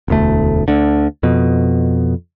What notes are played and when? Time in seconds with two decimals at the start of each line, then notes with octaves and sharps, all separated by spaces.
0.08 E1 D2 A3
0.68 D2 D3
1.23 F2 B2